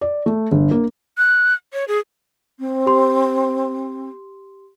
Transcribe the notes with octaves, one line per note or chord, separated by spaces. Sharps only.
D5
A3
G1
A#3
F#6
C#5
G#4
C4
G4 C6